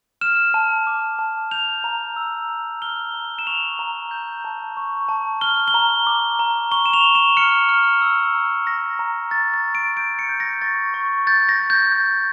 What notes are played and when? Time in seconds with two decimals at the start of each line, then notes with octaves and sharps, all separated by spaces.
0.21 F6 E7
0.54 A5
0.87 D6
1.19 A5
1.51 G6 F7
1.84 A#5
2.16 E6
2.49 A#5
2.82 F6 G7
3.14 A#5
3.39 E7
3.47 C#6 F7
3.79 A#5
4.11 G6
4.45 A5
4.77 C#6
5.09 A5
5.41 F6 G7
5.68 G7
5.74 A#5
6.07 D6
6.39 A#5
6.72 C#6 G7
6.86 E7
6.93 F7
7.05 C#6
7.15 E7
7.37 F6 C#7
7.69 F6
8.02 E6
8.34 A#5
8.67 C#6 A#6
8.99 A#5
9.31 C#6 A6
9.54 A6
9.64 C#6
9.75 D7
9.97 G6 D7
10.19 C#7
10.29 G6
10.40 A#6
10.62 C#6 A6
10.94 C#6
11.27 G6 A6
11.49 A#6
11.59 G6
11.70 G6
11.92 G6